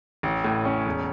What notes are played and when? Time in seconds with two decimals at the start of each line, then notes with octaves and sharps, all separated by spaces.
0.23 A1
0.44 A2
0.65 C#4
0.86 E1